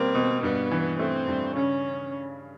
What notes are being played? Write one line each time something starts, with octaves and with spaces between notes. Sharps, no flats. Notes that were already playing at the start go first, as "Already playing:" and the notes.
Already playing: B2 G3 A#3 C4
B2
G2 B3
E3
A3 C4
G2
C#3 C#4